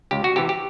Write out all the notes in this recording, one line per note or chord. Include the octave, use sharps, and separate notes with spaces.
C#2 G4
F#4
C3 E3 G4
G4